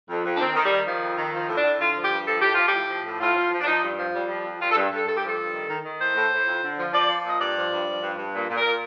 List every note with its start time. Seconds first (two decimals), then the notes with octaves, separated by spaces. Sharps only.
0.09 F2
0.24 F2
0.35 D4
0.40 D#3 C4
0.55 D#3
0.63 G3
0.71 D#3
0.86 D#3 F3
1.02 F2
1.18 D#3
1.33 F3
1.49 A2
1.56 D4
1.64 A2
1.79 D3 F4
1.95 F3
2.03 G4
2.10 G2
2.26 F3 A4
2.40 A2 G4
2.53 F3 F4
2.66 G4
2.73 A2
2.89 F3
3.05 A2
3.20 A2 F4
3.35 F3
3.51 F3
3.61 D4
3.66 F3 D#4
3.82 G2
3.97 F3
4.13 F2 G3
4.29 F3
4.44 F2
4.60 G2 F4
4.72 A4
4.75 G2
4.91 G2 A4
5.06 G2 A4
5.16 G4
5.22 F3 A4
5.38 G2
5.53 D#3
5.69 D#3
5.84 D#3
6.00 A2 C5
6.15 A2
6.31 A2
6.47 F2
6.62 D3
6.77 F3
6.93 F3 D5
7.09 F3
7.24 A#2 D#5
7.40 G2 D5
7.55 F3
7.71 G2
7.87 F3
8.02 G2
8.17 G2
8.33 A#2
8.49 A#2
8.56 A#4
8.65 A#2